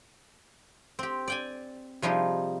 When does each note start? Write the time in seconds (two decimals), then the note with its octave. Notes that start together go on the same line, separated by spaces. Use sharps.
0.99 C4 G4
1.28 D5 G5 G#5
2.02 C3 F3 G3 D#4 G#4